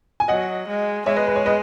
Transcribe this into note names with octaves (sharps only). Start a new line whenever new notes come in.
G#5
F#3 D#5 F#5
G#3
G#3 C#5 E5
B4 D#5
B4
C#5
B4 D#5